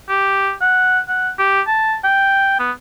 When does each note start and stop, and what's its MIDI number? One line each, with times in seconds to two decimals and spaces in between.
0.09 0.53 67
0.61 1.00 78
1.08 1.30 78
1.39 1.61 67
1.67 1.95 81
2.04 2.58 79
2.59 2.71 59